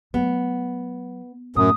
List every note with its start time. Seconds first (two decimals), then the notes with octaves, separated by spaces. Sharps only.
0.14 F#3 A3 B3
1.56 F#2 A2 D#6